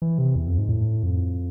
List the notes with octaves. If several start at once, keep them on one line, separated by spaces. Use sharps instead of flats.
E3
C3
E2
F2
G#2
A2
F2